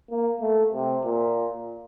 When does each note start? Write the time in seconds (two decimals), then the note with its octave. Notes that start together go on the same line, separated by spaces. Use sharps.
0.10 A#3
0.41 A3
0.73 C3
1.04 A#2